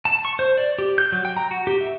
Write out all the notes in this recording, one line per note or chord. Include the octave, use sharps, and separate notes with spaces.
A5
C#6
C5
D5
G4
G6
F#3
G5
A#5
F#4
G4
E5